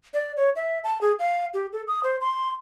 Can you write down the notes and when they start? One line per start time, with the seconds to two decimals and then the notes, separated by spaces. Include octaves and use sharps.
0.14 D5
0.37 C#5
0.56 E5
0.84 A5
1.01 G#4
1.19 F5
1.54 G4
1.73 A4
1.87 D#6
2.03 C5
2.21 C6